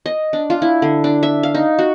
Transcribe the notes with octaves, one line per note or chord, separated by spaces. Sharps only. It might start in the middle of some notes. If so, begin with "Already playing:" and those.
D#5
D4
F4
E4
D3
D4
E5
F5
D#4
F#4